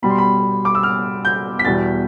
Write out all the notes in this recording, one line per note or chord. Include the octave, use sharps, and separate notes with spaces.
B2 G3 B5
C6
B5
D6
E6
F6
G6
B6
E2 B2 G3 A6